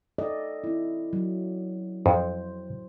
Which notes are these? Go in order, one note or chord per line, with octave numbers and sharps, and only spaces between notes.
A4 D5 D#5
C4 E4
F#3
F2 C5